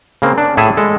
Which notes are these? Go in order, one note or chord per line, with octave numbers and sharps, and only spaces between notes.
C#3 A#3 C4
D4
A2 E4 G#4 A4 E5 G#5
G#3 A4